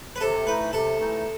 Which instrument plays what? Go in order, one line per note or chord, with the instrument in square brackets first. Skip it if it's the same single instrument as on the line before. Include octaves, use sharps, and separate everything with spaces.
[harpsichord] B4
[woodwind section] C3 [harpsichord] A4
[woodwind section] E3 A3 D#4 [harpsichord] B4
[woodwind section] C3 [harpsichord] A4
[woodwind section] E3 A3 D#4